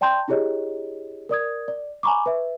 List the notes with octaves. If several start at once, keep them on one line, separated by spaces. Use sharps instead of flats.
D5 G5 A5 C6 G6
D4 E4 G4 G#4 C#5 D#5
A#4 D5 D#6 G#6
D5
G#5 A#5 B5 C#6 D6
B4 E5